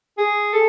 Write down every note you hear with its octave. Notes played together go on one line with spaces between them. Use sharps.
G#4
A4